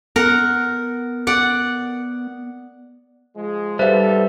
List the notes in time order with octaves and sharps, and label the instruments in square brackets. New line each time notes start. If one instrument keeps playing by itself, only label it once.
[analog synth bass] B3 [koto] A#4 F#5
[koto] D5 F#5
[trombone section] F3 G#3
[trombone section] B1 A4 [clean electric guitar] G3 [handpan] B4 E5 [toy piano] C5 F5